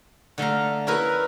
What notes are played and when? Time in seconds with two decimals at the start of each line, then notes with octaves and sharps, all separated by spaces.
0.38 D3 A3 F5 A#5
0.87 C#4 E4 A#4 B4